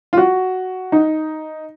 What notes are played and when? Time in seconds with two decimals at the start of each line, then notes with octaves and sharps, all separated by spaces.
0.13 F4
0.17 F#4
0.92 D#4